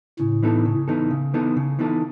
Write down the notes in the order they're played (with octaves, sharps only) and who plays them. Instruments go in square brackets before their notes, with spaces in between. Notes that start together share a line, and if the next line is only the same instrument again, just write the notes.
[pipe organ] A2 [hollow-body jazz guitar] C#3
[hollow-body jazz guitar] E3 B3 D#4 A4
C#3
E3 B3 D#4 A4
C#3
E3 B3 D#4 A4
C#3
E3 B3 D#4 A4